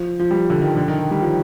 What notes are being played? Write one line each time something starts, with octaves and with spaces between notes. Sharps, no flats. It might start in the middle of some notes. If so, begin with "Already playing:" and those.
Already playing: F3
F3
G3
D3
D#3
D3
D#3
D#3
G3
F3